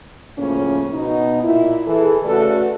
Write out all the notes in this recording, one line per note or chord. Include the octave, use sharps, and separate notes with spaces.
A2 C#3 F3 A#3 C#4
B2 D#4
A#2 E4
E3 G#4 A4
C#3 A3 F#4 A4 B4 D5